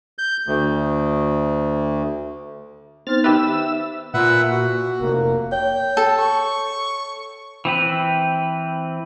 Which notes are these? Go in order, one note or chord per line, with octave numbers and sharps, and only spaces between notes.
G6
D2
B3 C4 D#4 C5 F6 A6
D#3 G4 B4 E5 E6
A#2 B4 E5 F#5
F#4
F1 A#3
C#5 G5
A4
C#6
E3 C4 B4